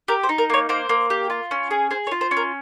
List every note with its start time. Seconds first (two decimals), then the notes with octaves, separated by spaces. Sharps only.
0.08 G4 A#4
0.23 C5
0.29 D#4
0.38 A#4
0.50 A#3 C#5
0.69 A#3 C5
0.89 A#3
1.10 G4
1.30 F4
1.51 C#4
1.71 G#4
1.91 G#4 C5
2.07 C#5
2.11 F4
2.21 C5
2.31 C#4
2.37 A#4